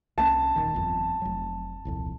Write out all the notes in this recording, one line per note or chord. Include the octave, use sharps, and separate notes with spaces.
C2 A#3 C#4 A5
D#1 D#3
G1 F2
F1 F#3
D#1 C2 F2